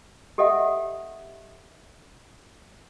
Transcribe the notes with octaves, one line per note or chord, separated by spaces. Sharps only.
G4 A4 D#5 E5 F#5